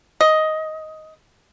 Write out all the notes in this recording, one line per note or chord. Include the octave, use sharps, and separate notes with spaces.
D#5